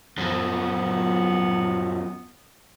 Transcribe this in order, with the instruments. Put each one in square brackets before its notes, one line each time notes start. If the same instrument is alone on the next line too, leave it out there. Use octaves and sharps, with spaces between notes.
[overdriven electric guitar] F#2 F3 [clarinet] B3